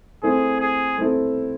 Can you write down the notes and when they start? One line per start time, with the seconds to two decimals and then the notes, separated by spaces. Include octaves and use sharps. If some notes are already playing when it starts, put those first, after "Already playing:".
0.23 A3 C4 E4 G#4 A4
0.60 G#4
0.98 A3 C4 E4 A4